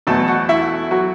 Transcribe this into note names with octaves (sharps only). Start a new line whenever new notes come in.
E2 B2 F#3 A3 A4 A5
F#4 F#5
E4 E5
F#3 F#4